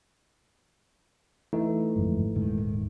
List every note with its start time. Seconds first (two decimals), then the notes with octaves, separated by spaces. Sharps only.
1.53 E3 A3 D#4
1.96 G1 F2 G#2
2.35 D#1 G#2 D#3